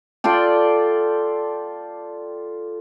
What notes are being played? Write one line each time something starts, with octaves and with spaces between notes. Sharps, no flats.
F4 A4 D5 G5